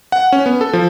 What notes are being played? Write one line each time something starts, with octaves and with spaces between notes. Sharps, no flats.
F#5
C#4
B3
A4
F3